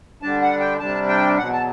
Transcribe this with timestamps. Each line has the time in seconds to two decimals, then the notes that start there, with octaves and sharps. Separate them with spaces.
0.22 D3 G3 D4 A5
0.42 F#5
0.60 G5
0.79 C3 G3 D4 A5
1.09 G5
1.38 E2 B2 F#3 F#5
1.52 A5